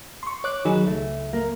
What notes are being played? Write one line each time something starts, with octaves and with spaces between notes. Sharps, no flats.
C6 C#6
C#5 D6 F#6
D#3 F#3 D#4 G#4
C#2 A3
A#3